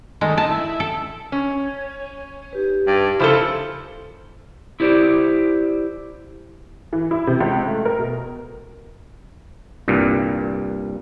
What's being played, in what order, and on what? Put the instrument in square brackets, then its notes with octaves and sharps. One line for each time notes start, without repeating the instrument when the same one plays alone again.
[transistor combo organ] D#3 A3 [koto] G#3
[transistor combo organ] A3 D#4 [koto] A5
[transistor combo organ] E4
[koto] A4
[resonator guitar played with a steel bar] C#4 [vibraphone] C#6
[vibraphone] D#4 G4 B4
[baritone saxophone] G2
[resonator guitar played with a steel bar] C#3 E4 A4 [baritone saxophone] F3
[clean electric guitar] E4 G4 C5 D5
[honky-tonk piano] E3
E4
C3
C#2
A3
A#4
B2
[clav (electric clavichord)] C2 G2 A#2